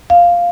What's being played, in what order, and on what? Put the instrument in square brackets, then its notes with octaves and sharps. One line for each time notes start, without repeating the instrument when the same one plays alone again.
[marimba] F5